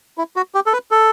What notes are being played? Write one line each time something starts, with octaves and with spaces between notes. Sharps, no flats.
E4
F#4
G4
A4
B4
A4